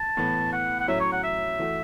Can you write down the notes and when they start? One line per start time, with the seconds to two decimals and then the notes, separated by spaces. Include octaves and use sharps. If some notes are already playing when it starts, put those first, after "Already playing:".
Already playing: A5
0.17 A2 E3 B3
0.52 F#5
0.80 F#5
0.88 A2 F#3 C#4 E5
1.00 C#5
1.12 F#5
1.24 E5
1.59 E3 A3 F#4